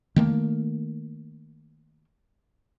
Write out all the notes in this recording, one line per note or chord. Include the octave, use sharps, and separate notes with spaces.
D#3 A3 A#3